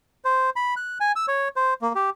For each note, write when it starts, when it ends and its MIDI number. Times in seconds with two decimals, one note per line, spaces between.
0.25 0.50 72
0.56 0.75 83
0.77 0.98 90
1.00 1.12 80
1.16 1.26 88
1.28 1.48 73
1.56 1.74 72
1.82 1.93 58
1.95 2.10 67